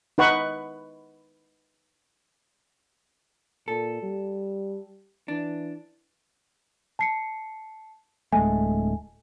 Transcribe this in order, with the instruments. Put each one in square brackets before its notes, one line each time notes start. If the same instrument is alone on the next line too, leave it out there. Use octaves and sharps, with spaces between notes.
[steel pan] D#4 B4 F#5 C#6
[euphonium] A#2 [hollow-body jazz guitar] A4
[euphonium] G3
[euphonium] E3 [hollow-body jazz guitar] D4
[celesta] A5 C7 C#7
[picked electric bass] D1 G#3 A3 [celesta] G#5